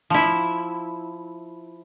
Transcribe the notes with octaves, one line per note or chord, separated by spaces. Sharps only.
F3 E4